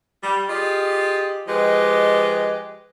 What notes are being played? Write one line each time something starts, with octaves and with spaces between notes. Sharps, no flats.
G3
F4 G4 G#4 D#5
F3 G#3 G4 B4 D#5